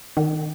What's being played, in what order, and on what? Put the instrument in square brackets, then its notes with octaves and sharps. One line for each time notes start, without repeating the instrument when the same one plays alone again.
[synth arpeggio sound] D#3